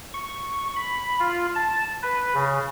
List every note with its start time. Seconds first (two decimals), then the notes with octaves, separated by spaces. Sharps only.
0.14 C#6
0.76 B5
1.19 F4
1.55 A5
2.02 B4
2.35 C#3